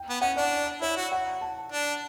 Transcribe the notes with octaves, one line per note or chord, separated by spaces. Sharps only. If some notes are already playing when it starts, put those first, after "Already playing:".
Already playing: G5
B3
C#4 F#5
D4 D5
E4 C#5
F#4
F#5
A5
D4